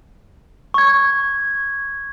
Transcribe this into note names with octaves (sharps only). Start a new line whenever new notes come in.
C#6 G#6